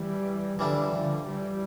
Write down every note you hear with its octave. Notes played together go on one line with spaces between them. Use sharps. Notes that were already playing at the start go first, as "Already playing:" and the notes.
Already playing: E3 G3
D3 E3 F3 G3 D4
D3 F3
E3 G3